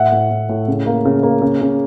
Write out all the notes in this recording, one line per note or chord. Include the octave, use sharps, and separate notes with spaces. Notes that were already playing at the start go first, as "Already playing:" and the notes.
Already playing: A2 E5 F#5
A2
A2
A2
C#3
A#3
C#3
A#3
C#3
C#3